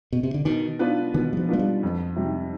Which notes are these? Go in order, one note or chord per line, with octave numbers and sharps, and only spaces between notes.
B2
C3
D3
B2 D#3
B3 D4 F4 B4
B2 D#3
G3
F3
G#3 B3 D4 F4 B4
G3
F2
C3 G3